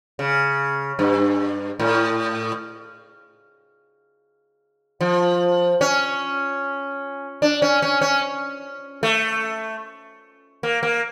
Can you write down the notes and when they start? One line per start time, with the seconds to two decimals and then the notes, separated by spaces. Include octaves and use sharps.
0.19 C#3
0.99 G2
1.80 A2
5.01 F3
5.81 C#4
7.42 D4
7.62 C#4
7.82 C#4
8.01 C#4
9.03 A3
10.63 A#3
10.83 A#3